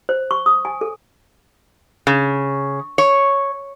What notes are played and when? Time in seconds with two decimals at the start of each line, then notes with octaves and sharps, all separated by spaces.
0.09 C5
0.31 C#6
0.46 D#6
0.65 G#5
0.81 A4
2.07 C#3
2.98 C#5